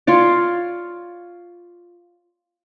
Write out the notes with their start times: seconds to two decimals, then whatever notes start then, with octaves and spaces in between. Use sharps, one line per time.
0.07 F4 C#5 D5